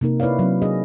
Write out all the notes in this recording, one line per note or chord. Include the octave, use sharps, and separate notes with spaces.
C3 A#3 D#4 A#4
E4 B4 C#5 D5 F5
F#3 C4
D4 G#4 D#5